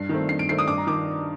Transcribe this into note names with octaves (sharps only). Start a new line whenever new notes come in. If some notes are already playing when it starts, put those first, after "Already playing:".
Already playing: G2 C7
D#3 A3 C4
G2 C7
D7
D#3 A3 C4 C7
D#6
G2 D6
A#5
D#3 D6